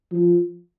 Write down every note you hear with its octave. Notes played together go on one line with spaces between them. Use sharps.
F3